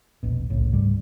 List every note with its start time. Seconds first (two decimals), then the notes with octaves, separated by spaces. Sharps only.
0.23 E1 A#1 B2
0.50 F#1 C2 A2 C#3
0.72 D2 G#2 C#3 G3